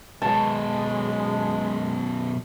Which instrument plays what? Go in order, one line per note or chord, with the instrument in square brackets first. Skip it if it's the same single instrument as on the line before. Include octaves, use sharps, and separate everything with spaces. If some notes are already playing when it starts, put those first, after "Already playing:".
[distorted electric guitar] F#2 B2 [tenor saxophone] G#3 [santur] A5